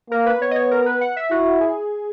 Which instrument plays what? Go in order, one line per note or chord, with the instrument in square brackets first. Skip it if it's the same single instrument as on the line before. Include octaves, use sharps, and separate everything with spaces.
[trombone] A#3 [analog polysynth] A#4
[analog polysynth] B4
[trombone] B3 [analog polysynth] C#5
[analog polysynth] D#5
C#5
A#4
B4
F#5
E5
[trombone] E4 [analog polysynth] F#4
[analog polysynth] G#4